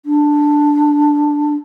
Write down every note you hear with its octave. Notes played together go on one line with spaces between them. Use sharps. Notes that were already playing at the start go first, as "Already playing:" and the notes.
D4